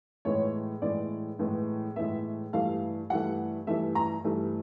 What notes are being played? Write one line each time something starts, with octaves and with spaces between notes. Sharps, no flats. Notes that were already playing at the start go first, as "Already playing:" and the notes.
A2 E3 G#3 B3 C#5
A2 E3 G#3 B3 D5
A2 E3 G#3 B3
A2 E3 G#3 B3 E5
G2 E3 A3 F5
G2 E3 A3 F#5
G2 E3 A3 E5
A#5
G2 E3 A3